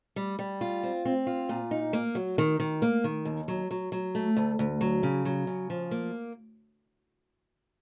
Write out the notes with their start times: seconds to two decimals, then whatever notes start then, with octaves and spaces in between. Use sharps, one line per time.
0.16 G3
0.39 G3
0.61 F4
0.83 C4
1.05 C4
1.27 F4
1.49 A#2
1.71 D#4
1.93 A#3
2.15 F#3
2.38 D#3
2.60 D#3
2.82 A#3
3.04 D#3
3.25 D#2
3.48 F#3
3.71 F#3
3.92 F#3
4.15 A3
4.37 D2
4.59 D2
4.81 F#3
5.03 C#3
5.25 F#3
5.47 C#3
5.70 F3
5.91 A#3